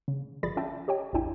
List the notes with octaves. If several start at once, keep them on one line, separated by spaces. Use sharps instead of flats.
C#3
G1 F3 G#4 D5 B5 A6
C#4 F4 E5 G5 A5
G4 C#5 D#5 G5
A1 E2 D4 E4 G5 G#5